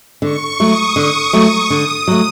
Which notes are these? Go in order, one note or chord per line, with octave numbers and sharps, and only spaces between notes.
D3 C#6
F#3 A3 D#6
D3
F#3 A3 D#6
D3 D#6
F#3 A3